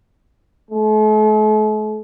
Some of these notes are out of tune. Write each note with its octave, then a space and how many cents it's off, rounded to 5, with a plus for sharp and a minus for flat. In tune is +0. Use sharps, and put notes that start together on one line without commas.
A3 -45